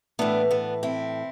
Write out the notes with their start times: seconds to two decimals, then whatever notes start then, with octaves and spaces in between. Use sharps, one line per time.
0.19 A2 E3 B3 D4
0.51 B3 D4
0.83 C4 E4